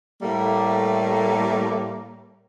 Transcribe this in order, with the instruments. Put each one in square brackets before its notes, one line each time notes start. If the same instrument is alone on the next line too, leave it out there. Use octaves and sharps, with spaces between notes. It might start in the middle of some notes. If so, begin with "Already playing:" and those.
[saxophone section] A2 G3 A3 A#3